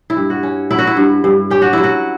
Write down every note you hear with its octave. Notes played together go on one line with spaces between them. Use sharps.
E4
G2
F#4
C#4
F#3 E4
F#4
E4
G2
G2
C#4 G4
F#4
F#3 E4
F#4